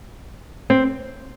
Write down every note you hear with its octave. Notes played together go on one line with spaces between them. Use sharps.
C4